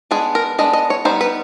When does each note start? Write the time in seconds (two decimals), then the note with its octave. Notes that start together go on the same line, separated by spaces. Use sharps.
0.11 G#3 B3 D4 G#4
0.35 A#4
0.58 G#3 B3 D4 D#5
0.73 D#5
0.90 C#5
1.05 G3 B3 D#4 C5
1.21 B4